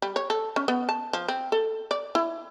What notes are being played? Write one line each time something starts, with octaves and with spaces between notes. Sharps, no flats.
G3
C#5
A4
C#4
B3
A5
F3
C4
A4
D5
E4